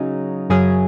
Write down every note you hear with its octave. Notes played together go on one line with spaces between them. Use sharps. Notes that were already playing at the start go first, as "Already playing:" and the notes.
Already playing: C#3 F#3 D#4
F#2 C#3 F#3 C#4 G#4